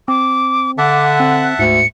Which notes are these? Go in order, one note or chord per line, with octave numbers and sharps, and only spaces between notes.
C4 D6
D3 E5 F#5 A5 D6
C4 F#6
D2 G#2 C#7